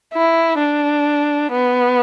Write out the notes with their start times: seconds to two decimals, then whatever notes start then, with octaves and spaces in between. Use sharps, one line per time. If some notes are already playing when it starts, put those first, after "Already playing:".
0.13 E4
0.59 D4
1.53 B3